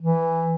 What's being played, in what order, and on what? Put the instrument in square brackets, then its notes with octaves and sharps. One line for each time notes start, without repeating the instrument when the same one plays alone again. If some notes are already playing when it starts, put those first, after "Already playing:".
[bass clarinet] E3